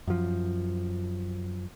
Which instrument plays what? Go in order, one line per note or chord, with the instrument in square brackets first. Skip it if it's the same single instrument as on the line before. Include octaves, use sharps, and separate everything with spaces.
[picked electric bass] F#2 F3